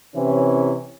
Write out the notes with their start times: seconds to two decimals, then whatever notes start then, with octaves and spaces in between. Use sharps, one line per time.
0.15 C3 E3 C#4